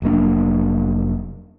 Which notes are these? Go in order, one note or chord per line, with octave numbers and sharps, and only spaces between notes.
F1 F#3 A#3 D4